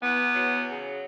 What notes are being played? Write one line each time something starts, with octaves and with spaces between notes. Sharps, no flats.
E2 B3
F#3
C#3